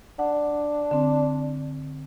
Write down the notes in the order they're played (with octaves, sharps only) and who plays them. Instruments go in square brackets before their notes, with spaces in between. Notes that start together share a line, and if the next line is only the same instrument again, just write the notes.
[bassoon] D4 [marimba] F#5
[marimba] D3 C4